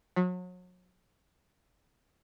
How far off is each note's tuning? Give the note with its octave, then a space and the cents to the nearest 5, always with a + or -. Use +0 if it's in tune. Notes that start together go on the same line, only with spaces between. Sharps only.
F#3 -35